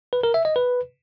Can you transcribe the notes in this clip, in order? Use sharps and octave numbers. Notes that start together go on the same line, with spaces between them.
B4
A#4
E5
D#5
B4